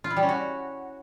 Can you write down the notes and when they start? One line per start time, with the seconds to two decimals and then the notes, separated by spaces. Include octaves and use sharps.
0.04 F4
0.10 E4
0.17 G3
0.23 C#4
0.29 F#4